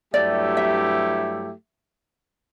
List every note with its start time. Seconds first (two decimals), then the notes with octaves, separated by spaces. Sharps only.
0.14 G2 F#3 A3 E4 G4 D5
0.57 E5